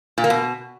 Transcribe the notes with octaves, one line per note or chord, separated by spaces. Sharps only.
A#2
A#3
B2